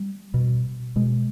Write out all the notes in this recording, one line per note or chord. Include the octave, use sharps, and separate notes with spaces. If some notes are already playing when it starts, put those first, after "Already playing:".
Already playing: G3
B2
B2 G#3